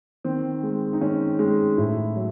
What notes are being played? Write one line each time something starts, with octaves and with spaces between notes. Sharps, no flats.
D#3 C4
G#3
D#4
D#3 C#4
G#3
A2 E4
F#3